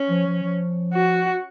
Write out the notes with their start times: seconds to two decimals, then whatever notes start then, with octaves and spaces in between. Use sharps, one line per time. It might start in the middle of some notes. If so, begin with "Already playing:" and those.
Already playing: C#4
0.09 F3
0.26 F3
0.43 F3
0.94 F#4